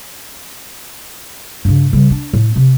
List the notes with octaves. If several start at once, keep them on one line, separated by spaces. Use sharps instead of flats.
G2 C#3
C#3 G3
D4
A2
C3